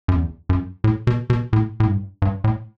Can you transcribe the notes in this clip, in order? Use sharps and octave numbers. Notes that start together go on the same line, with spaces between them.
F#2
E2
F#2
A2
B2
B2
A2
A2
G2
G2
A2